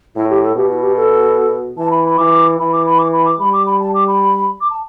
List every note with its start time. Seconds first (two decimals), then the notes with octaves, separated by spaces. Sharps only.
0.15 A2 E4
0.29 G4
0.43 A4
0.56 B2 G4
0.70 E4
0.83 G4
0.96 A4
1.78 E3 A5
1.91 B5
2.05 B5
2.18 E3 D6
2.59 E3 B5
2.73 D6
2.86 B5
2.99 D6
3.13 B5
3.26 D6
3.40 G3 B5
3.53 D6
3.66 B5
3.80 A5
3.94 D6
4.07 B5
4.61 D6
4.70 A5